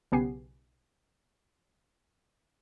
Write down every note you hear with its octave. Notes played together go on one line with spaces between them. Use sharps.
B1 C#3 B3 G4 G#5 C7